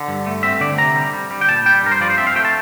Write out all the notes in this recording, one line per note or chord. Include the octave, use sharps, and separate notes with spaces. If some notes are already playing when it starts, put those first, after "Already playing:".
Already playing: D3
G2
A3
C4 E5
D3 D5
C3 A#5
G3
G3
G3
G5
A#2 A5
G3 G5
G2 A#4
C5
F3 D5
C5
C4 E5
F5
A3 G5
A5